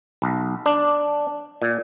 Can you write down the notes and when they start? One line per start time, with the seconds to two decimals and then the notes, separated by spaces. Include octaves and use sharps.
0.22 B1
0.66 D4
1.62 A#2